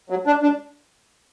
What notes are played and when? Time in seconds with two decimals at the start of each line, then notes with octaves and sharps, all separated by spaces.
0.10 F#3
0.27 D4
0.42 D4